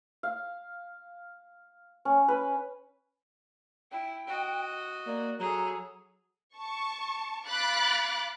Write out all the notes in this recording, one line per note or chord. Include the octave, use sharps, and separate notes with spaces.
F5
C#4
B4
E4 G5
F#4 D#5
A#3 D5
F#3 G#4 A4 A#5
A5 C#6
F5 B5 D6 F#6 A6